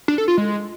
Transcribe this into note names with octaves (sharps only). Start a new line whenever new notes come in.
D4
A4
F4
G#3